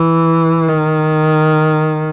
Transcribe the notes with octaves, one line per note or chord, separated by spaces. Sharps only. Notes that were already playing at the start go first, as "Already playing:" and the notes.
Already playing: E3
D#3